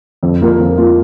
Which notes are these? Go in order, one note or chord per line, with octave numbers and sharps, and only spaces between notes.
F2
F3 A#3 F4
F2
F3 A#3 F4